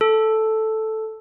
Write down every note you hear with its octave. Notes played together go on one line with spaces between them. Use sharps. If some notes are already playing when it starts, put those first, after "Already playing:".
A4